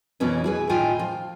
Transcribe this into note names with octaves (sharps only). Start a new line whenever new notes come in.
F2 B2 E3 B3 C#4
E4 G#4 B4
A2 D#3 F4 G5 G#5
F3